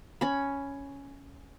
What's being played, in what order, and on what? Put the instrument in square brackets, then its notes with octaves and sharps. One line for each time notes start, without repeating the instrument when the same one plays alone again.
[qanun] C#4 B5